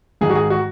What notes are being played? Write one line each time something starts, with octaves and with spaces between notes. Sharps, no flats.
G#2 D#3 G#3 G#4
F#4
G#4
F#4